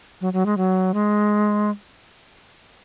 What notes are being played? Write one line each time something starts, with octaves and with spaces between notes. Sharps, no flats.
F#3
F#3
G#3
F#3
G#3